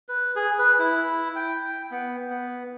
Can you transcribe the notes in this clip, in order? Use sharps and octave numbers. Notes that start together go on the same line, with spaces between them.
B4
G#4
B4
E4
G5
B3
B3